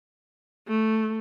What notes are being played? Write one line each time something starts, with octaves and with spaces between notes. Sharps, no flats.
A3